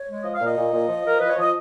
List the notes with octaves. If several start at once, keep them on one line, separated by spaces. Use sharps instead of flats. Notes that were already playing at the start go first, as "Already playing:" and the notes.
Already playing: C#5
G#3
F3 D#5
F5
A#2
D#5
A#2
A#2
F3
F3 A#4
F3 B4
C#5
F3 D#5